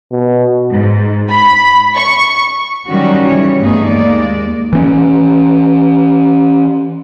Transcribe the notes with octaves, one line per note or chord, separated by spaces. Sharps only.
B2
G#2
B5
C#6
D#3 F#3 G3 C#4 F#4
C#3 E3 C#5
G2 A3 B3 D#4 G#4
D#2 G#3 A#3 D5
E3 C4 C#4